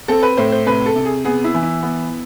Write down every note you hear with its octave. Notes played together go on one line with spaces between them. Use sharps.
C4 A4
B4
A2 C5
C5
C3 B4
A4
C3
G#4
B3 G#4
E4
E3
E4
B3